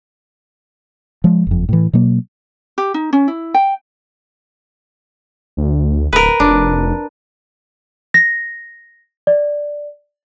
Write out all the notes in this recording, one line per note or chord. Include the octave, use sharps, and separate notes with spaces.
F3 G#3
F#1 F2
A2 E3
B2 F#3 A#3
G4
D#4
C#4
E4
G5
D2
D1 A#4 B4
F1 D4
A#6
D5